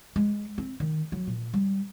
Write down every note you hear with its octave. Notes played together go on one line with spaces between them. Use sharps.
G#3
C4
D#3
F#3
A#2
G3